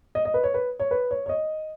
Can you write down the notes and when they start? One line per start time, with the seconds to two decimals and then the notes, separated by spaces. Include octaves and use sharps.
0.15 D#5
0.25 D#5
0.34 B4
0.44 C#5
0.54 B4
0.80 C#5
0.91 B4
1.11 C#5
1.26 C#5
1.29 D#5